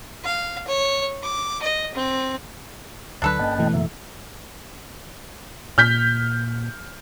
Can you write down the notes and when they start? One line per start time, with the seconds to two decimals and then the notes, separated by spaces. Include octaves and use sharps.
0.25 F5
0.67 C#5
1.23 D6
1.62 D#5
1.94 C4
3.22 D2 D3 F#3 D4 A4 B4
3.39 G1 A#3 C#4 D#5 G5 A5
3.58 B2 E3 A3
3.74 F#2 C#3 F#3 A#3 E5
5.78 A#2 F6 G6 B6